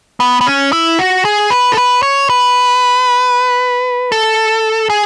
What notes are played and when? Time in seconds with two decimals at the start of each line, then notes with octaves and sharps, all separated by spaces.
0.20 B3
0.41 B3
0.47 C#4
0.73 E4
0.99 F#4
1.25 G#4
1.50 B4
1.72 A4
1.77 B4
2.03 C#5
2.30 B4
4.12 A4
4.90 G#4